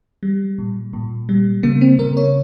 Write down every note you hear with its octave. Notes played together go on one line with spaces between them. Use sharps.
G3
A#2
A#2
G3
C#3 A#3
C4
C#3 A#4
C#5